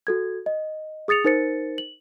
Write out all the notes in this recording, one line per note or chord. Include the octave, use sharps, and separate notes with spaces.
F#4 A4 G#6
D#5
G#4 D#6 A6 C#7 F7
D#4 A#4 C5 A6 C#7
F#7